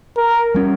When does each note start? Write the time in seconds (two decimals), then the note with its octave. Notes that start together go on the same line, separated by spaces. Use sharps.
0.17 A#4
0.54 G3 A#3 C#4